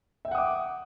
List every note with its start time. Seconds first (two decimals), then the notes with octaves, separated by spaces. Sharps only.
0.25 E5
0.28 G5
0.31 F#5
0.35 D#6
0.38 D6